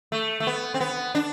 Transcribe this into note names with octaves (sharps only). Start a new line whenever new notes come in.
A3
A3
B3
C4
B3
D4